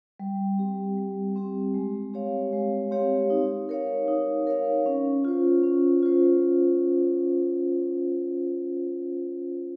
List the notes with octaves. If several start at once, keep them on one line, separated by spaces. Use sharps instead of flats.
G3
C4 G4
G3
C4 G4
G#3
C4 G4 C#5 F5
G#3
C4 G4 C#5 F5
D#4
A#4 C#5 F5
D#4
A#4 C#5 F5
C#4
F4 C5
C#4
F4 C5